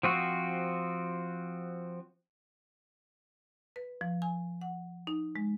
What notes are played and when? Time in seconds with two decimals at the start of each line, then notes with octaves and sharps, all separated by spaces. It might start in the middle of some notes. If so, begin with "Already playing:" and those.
0.03 F3 C4 F#4
3.76 B4
4.01 F3
4.22 G#5
4.61 F#5
5.07 D#4
5.36 G#3